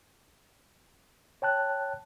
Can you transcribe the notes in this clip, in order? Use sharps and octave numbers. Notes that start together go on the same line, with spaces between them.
C#5 G5 A5 F#6